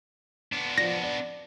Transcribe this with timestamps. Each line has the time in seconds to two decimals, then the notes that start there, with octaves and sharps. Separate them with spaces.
0.52 B3 D4
0.78 F3 D5 A#6
1.04 D5